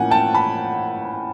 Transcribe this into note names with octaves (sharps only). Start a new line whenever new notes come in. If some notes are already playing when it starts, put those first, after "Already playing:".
Already playing: A2 F3 A#3 C#4 F#5 G#5
G5 A5
A5 B5